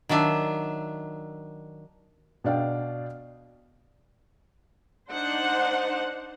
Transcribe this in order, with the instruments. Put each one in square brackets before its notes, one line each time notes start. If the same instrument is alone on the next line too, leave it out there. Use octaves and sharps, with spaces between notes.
[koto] D#3 F#3 D4 E5
[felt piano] B2 D4 D5 F5 G5
[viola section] D4 D#4 C5 F#5